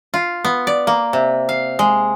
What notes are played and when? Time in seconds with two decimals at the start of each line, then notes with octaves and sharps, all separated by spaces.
0.14 F4
0.45 B3
0.67 D5
0.87 A#3
1.13 C3
1.49 F5
1.79 G#3